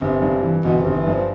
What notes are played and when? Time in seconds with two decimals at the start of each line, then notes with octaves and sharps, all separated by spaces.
0.01 G1 C3
0.22 G2
0.43 E3
0.64 G1 B2
0.80 C3
0.85 G1
0.96 E3
1.06 G2 F3